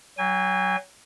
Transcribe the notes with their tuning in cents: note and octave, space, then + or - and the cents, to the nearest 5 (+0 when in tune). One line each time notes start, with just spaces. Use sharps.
F#3 +25 G#5 -30